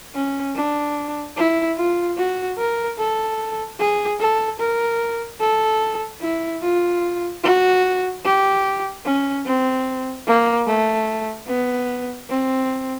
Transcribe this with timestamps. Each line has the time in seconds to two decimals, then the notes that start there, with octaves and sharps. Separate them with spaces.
0.15 C#4
0.56 D4
1.37 E4
1.77 F4
2.17 F#4
2.58 A#4
2.99 A4
3.80 G#4
4.21 A4
4.60 A#4
5.41 A4
6.22 E4
6.63 F4
7.44 F#4
8.25 G4
9.05 C#4
9.46 C4
10.27 A#3
10.68 A3
11.48 B3
12.30 C4